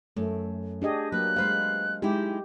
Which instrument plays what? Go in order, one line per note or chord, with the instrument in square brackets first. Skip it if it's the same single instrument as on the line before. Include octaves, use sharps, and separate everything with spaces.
[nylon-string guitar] F#2 [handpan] A3
[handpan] D4 G4 D#5 [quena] G#4
[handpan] F#3 A#3 [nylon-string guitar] B4 [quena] F#6
[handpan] G#3 C5 F5 [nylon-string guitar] B3 B4
[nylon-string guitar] G#3 D#4 E4 [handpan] G4